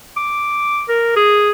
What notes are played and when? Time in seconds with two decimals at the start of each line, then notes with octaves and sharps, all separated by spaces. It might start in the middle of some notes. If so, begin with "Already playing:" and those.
0.17 D6
0.89 A#4
1.16 G#4